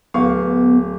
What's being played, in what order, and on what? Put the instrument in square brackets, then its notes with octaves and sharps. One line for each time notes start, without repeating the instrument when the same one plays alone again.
[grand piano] D1 F5 C#6 [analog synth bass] B3